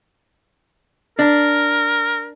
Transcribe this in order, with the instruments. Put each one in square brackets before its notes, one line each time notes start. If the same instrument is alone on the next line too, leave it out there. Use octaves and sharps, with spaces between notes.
[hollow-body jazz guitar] D4 [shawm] A#4